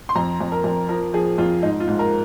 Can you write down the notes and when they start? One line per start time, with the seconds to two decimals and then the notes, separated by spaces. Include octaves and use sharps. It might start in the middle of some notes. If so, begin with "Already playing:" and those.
0.09 C6
0.15 F2 A#5
0.41 F2
0.52 A#4
0.64 F2
0.89 F3 A#4
1.13 F3 G#4
1.38 F2 F4
1.63 G#2 D#4
1.80 F4
1.88 G#2
1.99 A#4